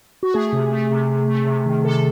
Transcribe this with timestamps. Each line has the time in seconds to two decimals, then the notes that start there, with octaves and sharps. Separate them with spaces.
0.23 F#4
0.34 A3 G#4
0.53 C3
0.72 A3
0.91 C3
1.10 C3
1.28 A3
1.46 C3
1.66 D#3
1.85 C3 A4